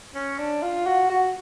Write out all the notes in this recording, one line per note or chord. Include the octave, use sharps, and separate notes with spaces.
C#4
D4
F4
F#4
F#4